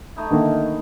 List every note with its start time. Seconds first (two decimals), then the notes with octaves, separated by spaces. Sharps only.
0.16 A3 D#4 E4
0.30 D3 D#3 A#3